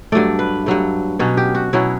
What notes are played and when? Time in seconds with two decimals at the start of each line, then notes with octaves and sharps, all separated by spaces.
0.12 G2 F#3 A3 D5
0.39 B4
0.66 G2 F#3 A3
1.19 B2 F#3 C#4
1.37 G4
1.55 F#4
1.73 B2 F#3 C#4 E4